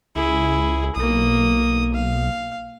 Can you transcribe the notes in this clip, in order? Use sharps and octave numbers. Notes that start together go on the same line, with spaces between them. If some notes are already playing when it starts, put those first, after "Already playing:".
C#2 E4 G#4
B1 A#3 D#6
F5